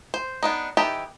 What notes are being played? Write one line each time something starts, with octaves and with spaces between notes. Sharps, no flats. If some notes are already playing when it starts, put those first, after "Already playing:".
C5
B3 D4 D#4
E3 D#4 G4 A4 A5